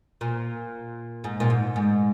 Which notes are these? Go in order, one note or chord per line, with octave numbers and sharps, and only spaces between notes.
A#2
G#2
A#2
G#2
G#2